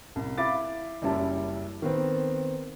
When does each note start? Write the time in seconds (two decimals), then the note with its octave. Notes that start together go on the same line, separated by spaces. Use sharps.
0.16 C2
0.38 E4 F5 B5 D6 A6
1.02 F#1 F#2 G3 E4 A5
1.82 D#3 B3 C4